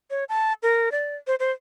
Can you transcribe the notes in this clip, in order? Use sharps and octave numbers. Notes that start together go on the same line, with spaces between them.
C#5
A5
A#4
D5
C5
C5